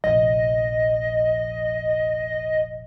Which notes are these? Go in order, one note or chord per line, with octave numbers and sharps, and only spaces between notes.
F1 A#1 D#5